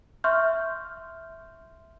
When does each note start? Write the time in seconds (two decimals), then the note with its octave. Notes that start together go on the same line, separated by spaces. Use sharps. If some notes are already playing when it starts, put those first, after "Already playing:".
0.24 E5 C6 C#6 F6 G6